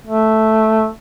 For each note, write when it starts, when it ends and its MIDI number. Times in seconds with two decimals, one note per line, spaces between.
0.07 0.87 57